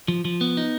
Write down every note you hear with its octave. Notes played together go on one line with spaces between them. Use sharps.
F3
F3
B3
D#4